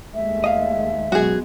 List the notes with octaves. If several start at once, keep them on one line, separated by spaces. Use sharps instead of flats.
D#2 G#3 A3 E5
D#5 F5
B1 F#2 G#3 B3 F#4 G#4